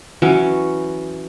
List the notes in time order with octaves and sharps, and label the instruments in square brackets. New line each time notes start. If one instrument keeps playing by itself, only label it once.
[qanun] E3 F#3 C#4